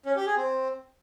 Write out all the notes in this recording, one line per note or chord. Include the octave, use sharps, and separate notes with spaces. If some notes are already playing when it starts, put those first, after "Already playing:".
C#4
G4
G#4
C4